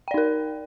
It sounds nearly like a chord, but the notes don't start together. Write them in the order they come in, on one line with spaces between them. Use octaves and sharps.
G5 D5 D#4 A#4